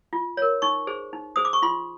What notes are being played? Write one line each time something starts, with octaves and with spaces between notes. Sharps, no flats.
F4
A#4 C#5
D#4 C#6
G#4 C5
D#4
G#4 C5 D#6
D6
C#6
F4 C6